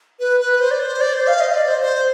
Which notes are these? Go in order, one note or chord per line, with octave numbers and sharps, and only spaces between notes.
B4
B4
C5
D5
C5
D5
C5
F5
D#5
D5
C5
C5